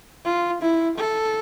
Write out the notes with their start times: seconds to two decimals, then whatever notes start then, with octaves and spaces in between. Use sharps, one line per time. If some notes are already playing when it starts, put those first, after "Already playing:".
0.25 F4
0.62 E4
0.98 A4